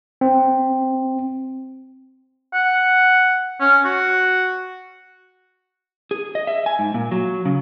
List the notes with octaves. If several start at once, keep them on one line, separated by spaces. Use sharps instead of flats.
C4
F#5
C#4
F#4
G#4
D#5
E5
G#5
G#2
A#2
F#3
C#3